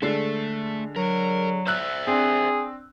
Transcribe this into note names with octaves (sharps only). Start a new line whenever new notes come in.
D3 G#3 A3 C7
F#3 A#4
C5 D5 E5 E6 F#6
C4 D4 G#4